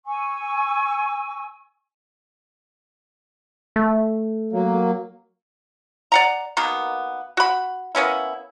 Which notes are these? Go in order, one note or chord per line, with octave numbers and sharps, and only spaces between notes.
G#5 C#6 E6
A3
F#3 A#3
D5 F#5 A#5
B2 D#3 A#3 B3
F#4 B5
A#3 B3 C#4 E4